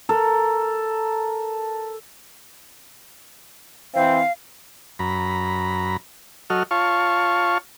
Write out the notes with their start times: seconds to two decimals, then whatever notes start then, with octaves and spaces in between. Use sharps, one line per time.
0.09 A4 A#4
3.94 E3 C4 F5
4.99 F#2 A#5 B5
6.50 F#3 F#4 A4 D#5 F6
6.71 F4 C#5 F5 A5 C#6